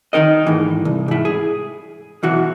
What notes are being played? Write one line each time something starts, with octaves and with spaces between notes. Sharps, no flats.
D#3 F#3 D#4 A#4 D#5
G#2 E3
C2
G#2 E4
G#4
B1 E3 F#4